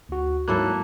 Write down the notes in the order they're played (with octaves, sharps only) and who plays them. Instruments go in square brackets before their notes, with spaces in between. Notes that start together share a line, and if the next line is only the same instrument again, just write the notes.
[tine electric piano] D2 F#4
[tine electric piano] G#2 F#3 F#6 [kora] A#3 E4 A4